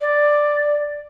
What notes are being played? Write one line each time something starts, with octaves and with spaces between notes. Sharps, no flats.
D5